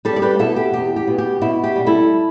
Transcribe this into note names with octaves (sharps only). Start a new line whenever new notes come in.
G3 A4 D5
D5
G4 B4
B2 E4 A4
G4
E2 G4
G4
B2
G4
B2 E4
G4
G3
E4 A4